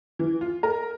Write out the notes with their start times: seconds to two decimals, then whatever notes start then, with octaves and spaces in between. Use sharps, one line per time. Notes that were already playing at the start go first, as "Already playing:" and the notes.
0.19 E3
0.41 F4
0.63 A#4